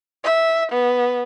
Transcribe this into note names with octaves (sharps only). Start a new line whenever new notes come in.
E5
B3